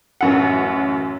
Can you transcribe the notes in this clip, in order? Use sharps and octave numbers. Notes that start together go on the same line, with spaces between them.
A1 F#2 F#5